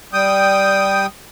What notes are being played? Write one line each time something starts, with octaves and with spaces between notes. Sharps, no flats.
G3 G5 D#6